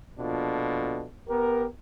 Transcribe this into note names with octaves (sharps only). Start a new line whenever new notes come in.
A#1 B2 D4 F4 A4
B3 G4 A#4